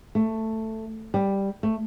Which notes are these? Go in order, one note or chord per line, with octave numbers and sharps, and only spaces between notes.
A3
G3
A3